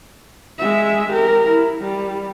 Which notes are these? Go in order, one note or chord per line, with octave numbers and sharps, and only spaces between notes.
G#3 E5
G4 A#4
E4
G3